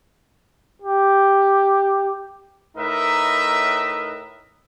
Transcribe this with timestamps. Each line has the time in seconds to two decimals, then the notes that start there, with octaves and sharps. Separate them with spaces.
0.82 G4
2.76 A2 D#4 A#4 B4 D#5 E5